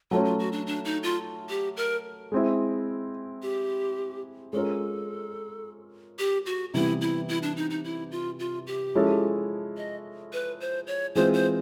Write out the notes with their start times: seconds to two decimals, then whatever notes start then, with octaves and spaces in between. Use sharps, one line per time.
0.11 F#3 A3 C#4 F4
0.25 F4
0.39 F#4
0.52 D4
0.67 D4
0.85 D#4
1.03 F4
1.50 G4
1.77 A#4
2.32 G#3 C4 E4
3.42 G4
4.53 G#3 C#4 F4 A4 A#4
6.19 G4
6.46 F#4
6.74 C3 E3 G3 B3 E4
7.01 E4
7.29 E4
7.43 D4
7.57 D#4
7.70 D#4
7.84 E4
8.11 F4
8.39 F4
8.67 G4
8.95 F3 G#3 C#4 E4 A4
9.77 D#5
10.33 B4
10.61 C5
10.87 C#5
11.15 E3 G#3 C4 F4 G#4 C5
11.34 C5